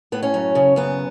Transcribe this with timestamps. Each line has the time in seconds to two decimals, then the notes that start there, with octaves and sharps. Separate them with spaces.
0.12 A2 B3
0.23 C#4
0.34 F#2
0.55 C#3
0.76 F#2 B3